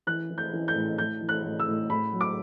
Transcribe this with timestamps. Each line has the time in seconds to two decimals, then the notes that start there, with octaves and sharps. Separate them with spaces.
0.07 E3 F#6
0.30 E3
0.38 G6
0.53 E3
0.68 G6
0.75 A2
0.98 A2 G6
1.21 E3
1.29 F#6
1.45 A2
1.60 E6
1.68 A2
1.90 A2 B5
2.13 F#3
2.21 D6